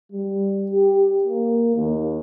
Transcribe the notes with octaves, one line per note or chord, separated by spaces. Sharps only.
G3
G4
A#3
D#2